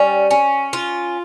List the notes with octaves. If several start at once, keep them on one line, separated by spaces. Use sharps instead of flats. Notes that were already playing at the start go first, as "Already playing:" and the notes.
Already playing: G3 C#4
C#4
F4